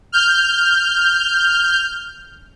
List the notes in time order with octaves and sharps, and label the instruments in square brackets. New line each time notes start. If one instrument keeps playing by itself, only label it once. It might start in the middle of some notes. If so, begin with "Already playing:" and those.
[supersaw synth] F6 G6